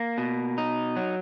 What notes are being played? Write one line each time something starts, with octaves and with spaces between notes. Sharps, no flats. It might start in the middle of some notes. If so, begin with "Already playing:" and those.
Already playing: A#3
B2
D#4
F#3